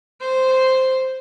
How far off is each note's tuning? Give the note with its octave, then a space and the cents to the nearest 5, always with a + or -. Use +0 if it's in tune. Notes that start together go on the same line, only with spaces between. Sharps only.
C5 -5